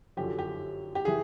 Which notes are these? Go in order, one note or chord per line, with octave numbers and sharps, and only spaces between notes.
F#2 D3 F3 G4
G4
G4
E3 G#4